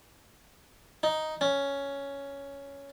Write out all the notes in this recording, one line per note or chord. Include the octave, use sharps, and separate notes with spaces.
D#4
C#4